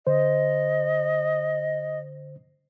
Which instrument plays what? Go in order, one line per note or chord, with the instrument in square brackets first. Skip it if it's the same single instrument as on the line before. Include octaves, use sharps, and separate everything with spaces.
[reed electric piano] D3 C5 [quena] D#5